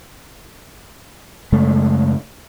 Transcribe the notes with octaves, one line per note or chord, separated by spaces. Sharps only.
F#2 C#3 G#3 A3